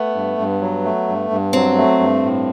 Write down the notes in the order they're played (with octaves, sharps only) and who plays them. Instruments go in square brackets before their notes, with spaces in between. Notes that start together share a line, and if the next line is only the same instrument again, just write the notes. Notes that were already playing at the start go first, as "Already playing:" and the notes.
Already playing: [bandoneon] A3 [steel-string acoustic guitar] B3
[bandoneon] G2
G2
F#3
A3
G2
G2
[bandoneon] F#3 [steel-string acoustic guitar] C4
[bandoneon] A3
G2
A2